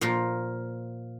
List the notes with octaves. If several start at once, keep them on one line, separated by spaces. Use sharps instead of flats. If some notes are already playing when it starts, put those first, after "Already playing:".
A#2 F3 A#3 F4 A#4